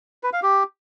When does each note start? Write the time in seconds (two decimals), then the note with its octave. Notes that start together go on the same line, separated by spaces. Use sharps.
0.23 B4
0.33 F5
0.43 G4